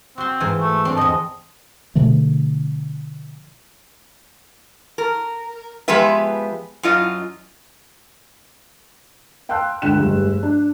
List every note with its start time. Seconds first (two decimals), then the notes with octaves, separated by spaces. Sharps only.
0.18 C4 F#4 C6
0.40 G#2 E3 F4
0.61 A3
0.85 C4 D4 A4
0.97 E2 F3 D#5
1.95 B2 D3 F3 A3
4.98 A#4
5.88 F3 G#3 B3 G4 B4 E5
6.83 F#2 F4 D#5
9.49 F5 G5 A5 C6 E6 F#6
9.82 C#2 D3 G5 F#6 E7
9.99 F1 G2 G#3
10.43 D4